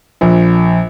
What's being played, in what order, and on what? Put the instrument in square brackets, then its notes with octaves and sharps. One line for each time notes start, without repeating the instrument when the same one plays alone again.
[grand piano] A#1